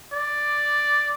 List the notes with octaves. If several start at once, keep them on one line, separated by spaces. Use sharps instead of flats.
D5